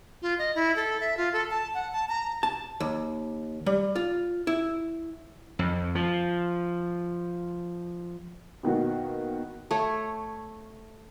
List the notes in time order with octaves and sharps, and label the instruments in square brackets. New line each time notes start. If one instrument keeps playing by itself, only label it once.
[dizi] F4
D#5
E4
A4
E5
F4
A4
A5
F#5
A5
A#5
[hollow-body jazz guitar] A5
D#2
G3
F4
E4
[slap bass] F2
F3
[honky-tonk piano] B2 D#3 A#3 F#4
[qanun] A3 C#5